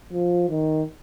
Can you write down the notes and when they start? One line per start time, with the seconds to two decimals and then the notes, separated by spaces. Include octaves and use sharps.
0.12 F3
0.49 D#3